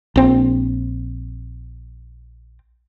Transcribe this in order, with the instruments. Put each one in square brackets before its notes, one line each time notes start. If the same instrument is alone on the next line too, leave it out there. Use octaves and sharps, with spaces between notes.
[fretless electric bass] A#1 C4